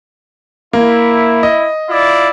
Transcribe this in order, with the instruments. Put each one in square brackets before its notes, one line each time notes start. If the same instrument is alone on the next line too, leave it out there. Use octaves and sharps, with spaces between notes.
[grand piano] A#3 [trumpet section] E4
[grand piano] D#5
[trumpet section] E4 F4 D5